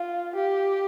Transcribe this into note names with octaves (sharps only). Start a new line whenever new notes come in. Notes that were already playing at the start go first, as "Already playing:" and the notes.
Already playing: F4
G4